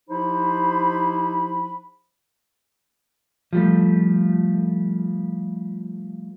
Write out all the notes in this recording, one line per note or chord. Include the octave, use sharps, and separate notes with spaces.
F3 D#4 E4 G4 C5 B5
F3 G3 A3